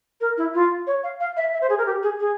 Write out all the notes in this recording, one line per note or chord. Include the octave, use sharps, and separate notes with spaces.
A#4
E4
F4
C#5
F5
F5
E5
E5
C5
G#4
A#4
G4
G#4
G#4